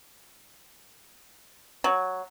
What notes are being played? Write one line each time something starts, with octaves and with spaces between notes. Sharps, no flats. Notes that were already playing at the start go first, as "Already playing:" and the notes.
F#3